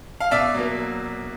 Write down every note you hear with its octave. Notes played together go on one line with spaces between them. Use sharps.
F5
B2 D5 E5
F#3 A#3